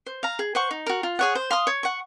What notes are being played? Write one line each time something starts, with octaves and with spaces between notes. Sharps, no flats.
C5
F5 A#5
G#4
C5 F#5 C#6
D#4
F#4 A#4
F4
G#4 C#5 F#5
C5
F5 C6 D#6
C#5
F#5 C#6